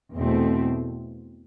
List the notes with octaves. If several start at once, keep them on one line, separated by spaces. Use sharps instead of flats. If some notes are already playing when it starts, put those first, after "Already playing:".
E2 B2 A3 C4